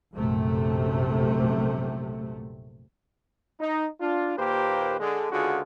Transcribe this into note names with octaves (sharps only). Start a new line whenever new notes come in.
A#1 F#2 C3 A3
D#4
D4 F4
D#2 A#2 A#3 G4 B4 C5
D3 G#3
C#2 D3 F4 F#4 G#4